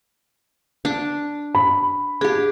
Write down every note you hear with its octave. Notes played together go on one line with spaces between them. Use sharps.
D4
B5
D4 G4 G#4